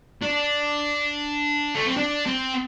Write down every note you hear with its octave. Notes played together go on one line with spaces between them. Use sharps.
D4
A3
C4
D4
C4